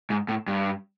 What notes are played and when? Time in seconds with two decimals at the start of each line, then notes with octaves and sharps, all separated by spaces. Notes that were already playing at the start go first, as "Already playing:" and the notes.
0.10 G#2
0.28 A2
0.47 G2